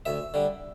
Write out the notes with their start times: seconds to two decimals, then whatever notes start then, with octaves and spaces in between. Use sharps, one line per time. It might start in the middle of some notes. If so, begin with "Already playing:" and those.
0.06 D2 E5
0.34 D3 G3